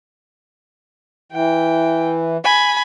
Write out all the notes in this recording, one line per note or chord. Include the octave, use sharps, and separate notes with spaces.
E3 G5
G#5 B5